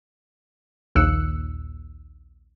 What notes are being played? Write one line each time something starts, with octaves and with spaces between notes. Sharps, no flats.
A#1 D#2 E6 F#6 C#7